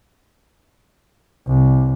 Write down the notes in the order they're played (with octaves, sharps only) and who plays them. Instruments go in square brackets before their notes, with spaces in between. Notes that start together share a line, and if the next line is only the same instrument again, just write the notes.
[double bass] C2